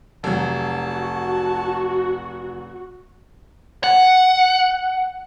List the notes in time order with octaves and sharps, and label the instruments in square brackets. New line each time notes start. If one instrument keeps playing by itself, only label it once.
[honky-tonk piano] F1 F#3 [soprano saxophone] A5
[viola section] F#4
[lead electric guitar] F#5